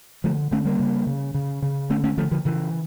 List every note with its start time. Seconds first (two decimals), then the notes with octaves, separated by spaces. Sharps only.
0.24 D3 F3 A3
0.51 D3 A3 C#4
0.65 G3 A#3
0.80 C#3
1.07 C#3
1.34 C#3
1.62 C#3
1.90 D3 A3 C#4
2.04 A3 C#4
2.17 D3 F3 A3
2.31 D3 F3
2.45 C#3 E3